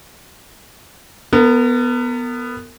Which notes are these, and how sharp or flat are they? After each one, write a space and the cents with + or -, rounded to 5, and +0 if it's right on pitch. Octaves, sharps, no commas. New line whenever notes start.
B3 +0 A#4 -40